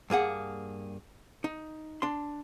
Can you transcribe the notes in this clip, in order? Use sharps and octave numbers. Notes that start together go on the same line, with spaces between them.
G2 A#3 G#4 F#5
D#4
D4 C6